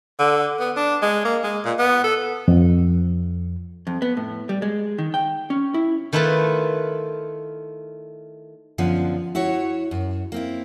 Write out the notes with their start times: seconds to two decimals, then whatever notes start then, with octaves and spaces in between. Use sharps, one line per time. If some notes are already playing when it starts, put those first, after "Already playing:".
0.19 D3
0.60 B3
0.76 D4
1.02 G#3
1.25 A#3
1.44 G#3
1.65 A#2
1.79 B3
2.04 A4
2.48 F2
3.87 F2
4.02 B3
4.17 A2
4.49 G3
4.62 G#3
4.98 D#3
5.14 G5
5.50 C#4
5.74 E4
6.13 D#3 A3 E4 F4 B4 A5
8.78 F#2 D3 F3 B3
9.35 E4 F#4 C#5
9.91 F#2
10.32 A#3 C4 E4